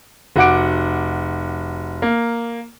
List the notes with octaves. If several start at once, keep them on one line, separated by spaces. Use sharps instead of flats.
F1 F#4 F#5 D6 D7
A#3